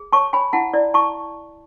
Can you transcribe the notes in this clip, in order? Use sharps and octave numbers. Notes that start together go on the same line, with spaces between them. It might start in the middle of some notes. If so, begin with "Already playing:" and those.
Already playing: G#4
C#5 A5 C#6
C#5 G#5 B5
E4 F#5 A5
E4 D5
E4 A5 C#6